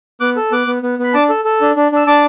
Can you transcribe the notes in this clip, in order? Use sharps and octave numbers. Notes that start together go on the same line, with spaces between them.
B3 D6 F#6
A4
B3 D6 F#6
B3
B3
B3 B5
D4 A5 D6
A4
A4
D4
D4
D4 E6
D4 A5 D6